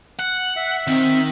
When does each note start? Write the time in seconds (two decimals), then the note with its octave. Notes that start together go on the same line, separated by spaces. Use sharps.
0.19 F#5
0.56 E5
0.87 D#3 C4